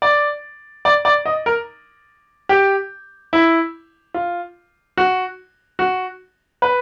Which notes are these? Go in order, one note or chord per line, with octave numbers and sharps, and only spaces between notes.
D5
D5
D5
D#5
A#4
G4
E4
F4
F#4
F#4
B4